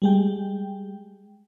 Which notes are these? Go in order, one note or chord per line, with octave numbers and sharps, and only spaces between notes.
G3 G#3 G5